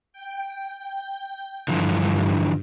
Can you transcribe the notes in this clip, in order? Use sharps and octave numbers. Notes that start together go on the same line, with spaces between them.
G5
G2 D3 E3 F3